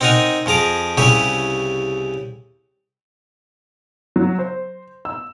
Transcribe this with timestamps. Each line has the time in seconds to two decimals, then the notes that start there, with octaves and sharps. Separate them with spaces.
0.01 C4 D#4 A#4 F#5 G#5 A#5
0.46 F2 F3 G#4 A#5 D6
0.97 C2 C#3 E4 G4 G#4 C#5
4.16 F#3
4.39 C5
5.05 E6